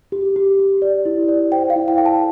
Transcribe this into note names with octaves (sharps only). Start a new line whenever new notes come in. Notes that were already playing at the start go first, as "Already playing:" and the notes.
G4
G4
G4
D5
E4
D5
C5 G5
F5
E4
G5
A4 G5
A5